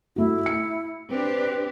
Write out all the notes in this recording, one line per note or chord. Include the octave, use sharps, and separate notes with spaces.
A3 E4 F#4
C#7
C4 D4 G4 B4